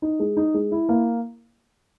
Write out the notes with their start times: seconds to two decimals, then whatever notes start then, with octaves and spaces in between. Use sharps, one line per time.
0.02 D#4
0.20 G#3
0.37 D#4
0.54 G#3
0.72 E4
0.89 A#3